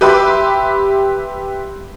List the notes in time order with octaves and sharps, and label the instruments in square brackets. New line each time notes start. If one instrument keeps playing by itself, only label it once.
[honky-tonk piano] G4 B4 E5 B5 C6 D6